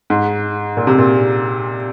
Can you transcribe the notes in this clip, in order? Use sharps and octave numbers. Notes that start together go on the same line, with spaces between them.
G#2
A#2
C3
A#2